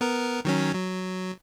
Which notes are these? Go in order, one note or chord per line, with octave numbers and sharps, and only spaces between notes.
B3 A#4
D#3 F#3 C#4
F#3